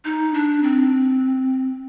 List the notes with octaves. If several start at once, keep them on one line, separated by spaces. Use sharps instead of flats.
D#4
D4
C4